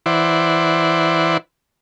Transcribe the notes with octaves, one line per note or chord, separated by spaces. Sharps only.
E3 E4 C5 D5 F#5